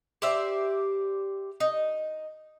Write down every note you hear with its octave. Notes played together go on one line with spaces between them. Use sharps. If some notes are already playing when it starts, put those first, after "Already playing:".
G4 C5 D5 E5
D#4